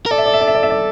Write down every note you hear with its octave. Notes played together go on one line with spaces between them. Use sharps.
A#4
A4 D5
E5
D5
E5
D5
E5
D5
E5
D5